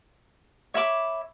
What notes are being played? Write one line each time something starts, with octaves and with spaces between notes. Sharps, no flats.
C#5 E5 B5 D6